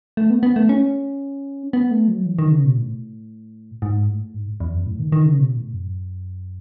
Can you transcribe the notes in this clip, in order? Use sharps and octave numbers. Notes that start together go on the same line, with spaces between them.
A3
B3
B3
A3
C#4
B3
A3
F#3
E3
D#3
C#3
B2
A2
G#2
A2
G#2
E2
F#2
A2
D#3
D#3
C#3
B2
A2
F#2